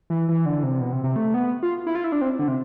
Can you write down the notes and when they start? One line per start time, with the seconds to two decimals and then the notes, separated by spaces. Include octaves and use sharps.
0.10 E3
0.29 E3
0.45 D3
0.63 C3
0.80 B2
0.92 C3
1.04 C3
1.16 A3
1.34 B3
1.63 F4
1.87 E4
1.95 F4
2.04 E4
2.12 D4
2.21 C4
2.39 D3
2.48 C3